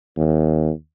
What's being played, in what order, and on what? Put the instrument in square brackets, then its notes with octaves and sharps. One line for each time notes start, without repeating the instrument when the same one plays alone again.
[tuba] D#2